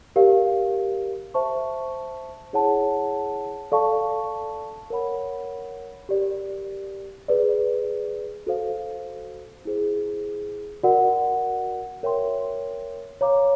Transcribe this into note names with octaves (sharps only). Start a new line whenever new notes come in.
G4 A#4 D5 F5
C5 E5 A5 C#6
E4 G#4 C#5 F#5 A5
A4 D5 F5 A5 C#6
A#4 C#5 F#5 B5
G4 A#4 D5
G#4 B4 D5
F#4 A4 C5 F5
E4 G#4 C5
F#4 A#4 D5 F#5
A#4 C#5 E5 G5 C6
C#5 F5 A#5 D6